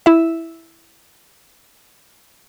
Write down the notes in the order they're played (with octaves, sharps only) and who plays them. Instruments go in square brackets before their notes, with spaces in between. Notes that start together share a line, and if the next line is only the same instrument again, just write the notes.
[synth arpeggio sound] E4 E5